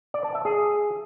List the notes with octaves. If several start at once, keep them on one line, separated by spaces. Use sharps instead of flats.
D5
A5
E5
G#4